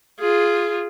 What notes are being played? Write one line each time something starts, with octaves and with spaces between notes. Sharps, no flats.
F4 G#4